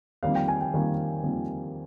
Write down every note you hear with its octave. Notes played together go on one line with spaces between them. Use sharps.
F2 D#3 G3 A#3 F5
G5
G#5
G5
F2 D#3 G3 A#3
F2 D#3 G3 A#3